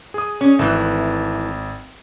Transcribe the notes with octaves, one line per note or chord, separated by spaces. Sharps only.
G#4 D#6
C#4
G#1 E3 A3